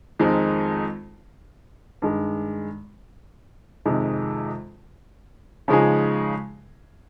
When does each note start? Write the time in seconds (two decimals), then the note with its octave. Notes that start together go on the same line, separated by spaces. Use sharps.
0.19 F2 D#3 G#3 C4 D#4
2.02 G2 D#3 G#3
3.85 F2 C3 D#3 G#3
5.68 C#3 F3 G#3 D#4 G#4